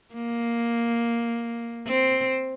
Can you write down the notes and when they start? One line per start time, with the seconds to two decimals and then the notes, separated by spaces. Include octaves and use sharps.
0.14 A#3
1.87 C4